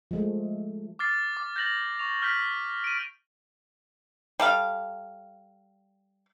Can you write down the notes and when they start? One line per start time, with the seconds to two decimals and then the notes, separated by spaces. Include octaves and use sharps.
0.11 F3 G#3 A3
0.99 D6 F6 A6 C7
1.37 D6
1.56 G6 A6 A#6 F#7
1.99 C#6 F7
2.22 F6 G6 A#6 B6
2.84 D7 D#7
4.40 G3 A4 F5